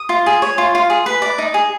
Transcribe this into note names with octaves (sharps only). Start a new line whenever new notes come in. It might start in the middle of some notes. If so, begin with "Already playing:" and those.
Already playing: D#6
F4
G#4
C#5
F4
F4
G#4
B4
D5
D#4
G#4